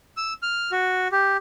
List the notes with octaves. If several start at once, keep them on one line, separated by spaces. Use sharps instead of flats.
E6
F6
F#4
G4